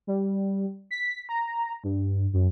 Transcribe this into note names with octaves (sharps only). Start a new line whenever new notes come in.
G3
B6
A#5
G2
F#2